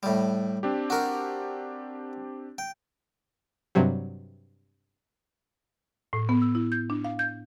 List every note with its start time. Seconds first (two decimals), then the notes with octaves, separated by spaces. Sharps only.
0.03 A2 G3
0.63 C4 D4 G4
0.90 F#4 A#4
2.58 G5
3.75 G2 C3 F#3 G3
6.13 A2
6.29 B3
6.42 E6
6.55 E4
6.72 G6
6.90 D4
7.05 F5
7.19 G6